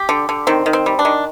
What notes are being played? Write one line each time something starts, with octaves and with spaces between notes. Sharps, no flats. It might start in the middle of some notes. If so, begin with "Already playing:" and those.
Already playing: G4
D3
D3
D#3 C4
D#3
C4
G3
D4
D#3